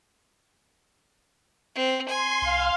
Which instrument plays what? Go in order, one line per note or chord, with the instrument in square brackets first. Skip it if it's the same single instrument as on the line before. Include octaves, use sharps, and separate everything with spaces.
[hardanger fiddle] C4
[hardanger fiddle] G#5 [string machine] C6
[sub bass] C2 [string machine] F5